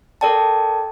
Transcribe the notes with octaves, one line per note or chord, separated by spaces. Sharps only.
A4 A#4 D5 G5 A5